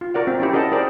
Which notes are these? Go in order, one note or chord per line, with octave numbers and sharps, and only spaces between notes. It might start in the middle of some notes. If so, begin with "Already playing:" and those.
F4
F#4 A#4 D5 F#5
C4
C#4 E4 G4
G#4 A#4 D#5 F#5 A5
G4 G#4 A#4 C5 D5